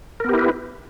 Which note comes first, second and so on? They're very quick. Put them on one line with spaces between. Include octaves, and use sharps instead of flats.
A#4 B3 G4 E4 B4